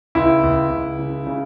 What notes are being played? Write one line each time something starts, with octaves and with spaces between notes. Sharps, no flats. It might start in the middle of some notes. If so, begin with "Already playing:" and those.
C#2 E4
C#2
C#2
C#3
C#3